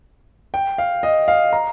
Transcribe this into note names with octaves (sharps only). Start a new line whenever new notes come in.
G5
F5
D#5
F5
A#5